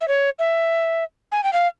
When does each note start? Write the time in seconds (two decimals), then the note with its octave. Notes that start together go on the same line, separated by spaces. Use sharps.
0.01 E5
0.08 C#5
0.39 E5
1.32 G#5
1.44 G5
1.53 F5